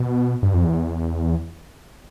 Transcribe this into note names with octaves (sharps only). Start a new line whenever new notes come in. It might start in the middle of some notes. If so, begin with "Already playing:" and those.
Already playing: B2
G2
F2
E2